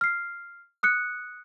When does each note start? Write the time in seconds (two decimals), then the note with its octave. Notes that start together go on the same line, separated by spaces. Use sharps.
0.01 F6 C7
0.83 D#6 F#6 C#7